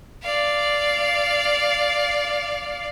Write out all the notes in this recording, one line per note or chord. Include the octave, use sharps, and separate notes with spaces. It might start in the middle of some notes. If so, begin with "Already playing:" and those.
D5 F5